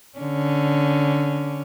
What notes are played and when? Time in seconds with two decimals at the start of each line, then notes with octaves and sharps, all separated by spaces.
0.19 D3 C#4